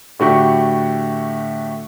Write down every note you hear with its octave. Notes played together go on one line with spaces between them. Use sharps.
A2 D3 A3 F#4 G4 C#6